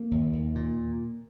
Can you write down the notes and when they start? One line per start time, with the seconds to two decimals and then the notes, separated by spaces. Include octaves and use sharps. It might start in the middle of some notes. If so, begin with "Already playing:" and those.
Already playing: A#3
0.11 D#2
0.33 D#2
0.55 A#2